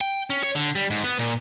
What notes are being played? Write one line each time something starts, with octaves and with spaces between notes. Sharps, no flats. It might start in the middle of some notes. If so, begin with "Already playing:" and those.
G5
C#4
C#5
D3
G3
G#2
B3
A#2